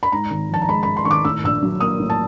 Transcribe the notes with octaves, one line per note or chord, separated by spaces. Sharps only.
B5
G#2 A#5
G#1
F3 A5
A#5
G#3 B5
G#2 B5
C6
G#1 C#6
D6
A2 E6
A#1 E6
F#3
A#3 D#6
A2
A5